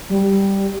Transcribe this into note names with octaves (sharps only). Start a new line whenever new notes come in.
G3